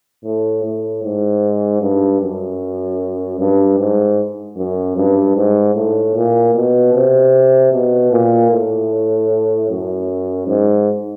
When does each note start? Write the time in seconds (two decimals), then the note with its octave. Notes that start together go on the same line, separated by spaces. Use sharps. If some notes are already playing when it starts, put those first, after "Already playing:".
0.25 A2
0.64 A2
1.03 G#2
1.81 G2
2.22 F#2
3.39 G2
3.79 G#2
4.57 F#2
4.97 G2
5.36 G#2
5.75 A2
6.15 A#2
6.55 B2
6.94 C3
7.72 B2
8.12 A#2
8.51 A2
9.69 F#2
10.47 G#2